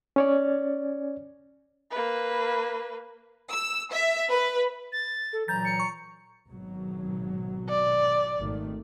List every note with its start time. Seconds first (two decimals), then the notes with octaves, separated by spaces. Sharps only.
0.16 C#4 C#5 D5
1.91 A#3 B4
3.50 E6
3.92 E5
4.32 B4
4.92 A6
5.33 A4
5.48 A#2 E3 F#3 A#5 G6 A6
5.65 C#7
5.80 C#6
6.48 G#1 B2 F#3
7.69 D5
8.39 G#1 D#3 A3